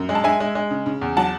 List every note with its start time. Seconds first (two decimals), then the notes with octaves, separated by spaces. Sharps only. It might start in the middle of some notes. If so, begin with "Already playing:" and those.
Already playing: F#2
0.09 G#3
0.15 A5
0.24 G#3 E5 G#5
0.40 G#3
0.55 G#3
0.70 C#3
0.86 C#3
1.01 E2
1.16 F#3 F#5 A5